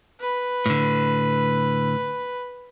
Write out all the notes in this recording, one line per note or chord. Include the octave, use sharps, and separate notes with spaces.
B4
A2 D3